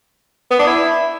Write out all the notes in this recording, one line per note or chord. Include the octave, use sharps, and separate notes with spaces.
B3
D4
E4